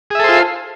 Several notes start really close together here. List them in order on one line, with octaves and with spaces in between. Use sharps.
G#4 E5 A4 C5 F4